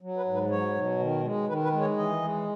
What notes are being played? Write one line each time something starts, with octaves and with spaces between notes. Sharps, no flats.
F#3
B4
G#2
B4
F#3 C#5
B2
D#3
G#3
D#3 B4
B4
G#3
C#5
E3 D#5
G#3